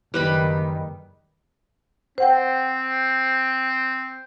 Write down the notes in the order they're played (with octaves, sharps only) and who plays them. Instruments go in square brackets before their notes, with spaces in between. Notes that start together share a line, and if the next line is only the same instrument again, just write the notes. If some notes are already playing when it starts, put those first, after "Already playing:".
[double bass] F#1 D#3 [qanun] G3 B4 B5
[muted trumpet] C4 [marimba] C5 F#5 G5